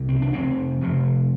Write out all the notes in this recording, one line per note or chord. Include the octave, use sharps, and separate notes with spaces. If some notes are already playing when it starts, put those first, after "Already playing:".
Already playing: C2 C3
C4
D4
F1 F2 C3 C4
F1 F2 C3